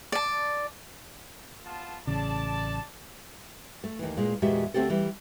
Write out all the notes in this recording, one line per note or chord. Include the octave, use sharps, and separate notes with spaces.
D5 A5
B3 F4 A5
A1 C#3 D5 A5
A3
D#2 E3
A#2 G#3
E2 A#2 G#3 F#4 G4 E5
D2 A3 C4 G4 A4
E3 G3